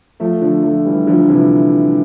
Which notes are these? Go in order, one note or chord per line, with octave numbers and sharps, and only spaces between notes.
F3 A3
D3 F3
F3 A3
E3 G3
D3 F3
C3 E3